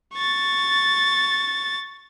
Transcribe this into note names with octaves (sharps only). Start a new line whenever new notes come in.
C#6 A6